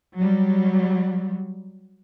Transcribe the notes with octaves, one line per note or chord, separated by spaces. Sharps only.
F#3 G3